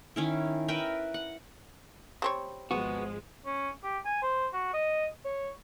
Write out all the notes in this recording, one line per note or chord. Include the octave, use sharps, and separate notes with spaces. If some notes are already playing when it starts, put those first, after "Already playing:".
D#3 C#4 E4
A#4 B4 E5 G5
F#5
G3 C4 C#5
G#1 F3 G#3 B3 F#4
C#4
G4
G#5
C5
F#4
D#5
C#5